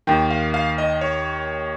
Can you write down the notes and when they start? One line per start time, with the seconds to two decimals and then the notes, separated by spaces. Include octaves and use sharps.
0.07 D#2 D#3 G5
0.30 F5
0.54 F5
0.78 D#5
1.01 C#5